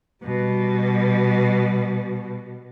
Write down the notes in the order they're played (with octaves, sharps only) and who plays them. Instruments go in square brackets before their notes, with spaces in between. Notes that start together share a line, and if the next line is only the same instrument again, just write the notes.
[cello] B2 G3